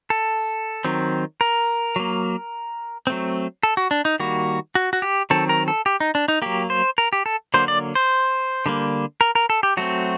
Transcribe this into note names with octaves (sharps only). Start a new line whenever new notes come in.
A4
D#3 F#3 C4
A#4
F#3 A#3
F#3 A3 C4
A4
F#4
D4
D#4
D#3 G3 A#3 F#4
F#4
F#4
G4
D#3 F#3 C4 A4
A#4
A4
G4
D#4
D4
D#4
F#3 A#3 G4
C5
A#4
G4
A4
D3 F#3 A#3 C5
D5
C5
D3 G3 A#3
A#4
A#4
A4
G4
F#3 A3 C4 F#4